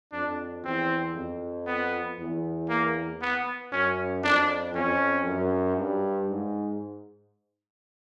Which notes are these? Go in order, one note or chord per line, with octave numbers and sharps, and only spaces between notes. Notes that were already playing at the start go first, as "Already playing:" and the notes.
F2 D4
E2 C4
F2
B3
E2
A#3
B3
F#2 C#4
F2 D4
F2 C#4
F#2
G2
G#2